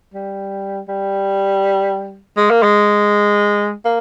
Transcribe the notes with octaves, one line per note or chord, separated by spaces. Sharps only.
G3
G3
G#3
A#3
G#3
A#3